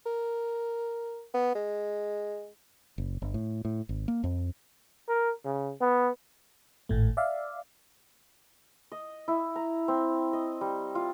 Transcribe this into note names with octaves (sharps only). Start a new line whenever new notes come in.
A#4
B3
G#3
F#1
G1
A2
A2
G#1
A#3
F2
A#4
C#3
B3
G#1 A2 A3
D5 E5 F5
D#5
E4
A#5
C4
D#5
G3
F4